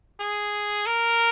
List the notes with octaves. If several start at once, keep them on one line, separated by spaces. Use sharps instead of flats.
G#4
A#4